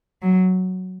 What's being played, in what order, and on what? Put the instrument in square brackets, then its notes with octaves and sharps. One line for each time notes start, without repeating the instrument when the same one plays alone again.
[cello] F#3